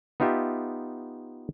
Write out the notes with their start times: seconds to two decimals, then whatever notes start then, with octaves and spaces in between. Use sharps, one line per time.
0.20 B3 D#4 F4 G4 E5